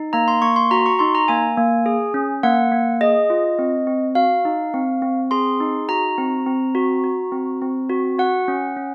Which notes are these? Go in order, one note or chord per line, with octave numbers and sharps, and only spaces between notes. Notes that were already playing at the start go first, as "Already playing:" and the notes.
Already playing: D#4
A#3 A#5
C6
A#3 C#6
C6
F#4 A#5
C#6
D#4 C6
A#5
A#3 G#5
A#3
G#4
C#4
A#3 F#5
A#3
G#4 D#5
F4
C4
C4
F#4 F5
D#4
C4
C4
G#4 C6
D#4
F#4 A#5
C4
C4
F#4
F#4
C4
C4
F#4
F#4 F#5
C#4
C#4